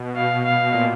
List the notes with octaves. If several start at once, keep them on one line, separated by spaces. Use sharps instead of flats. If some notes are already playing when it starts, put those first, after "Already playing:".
Already playing: B2
B2 F5
F5
A#2